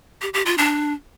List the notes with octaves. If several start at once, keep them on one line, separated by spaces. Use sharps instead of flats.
G4
G4
F4
D4